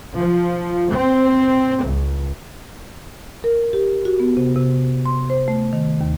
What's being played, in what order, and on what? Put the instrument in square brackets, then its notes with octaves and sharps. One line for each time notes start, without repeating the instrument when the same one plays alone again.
[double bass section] F3
C4
C#2
[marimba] A#4
G4
F#4
B3
C3
C3
C6
C5
A3
D#3
D#2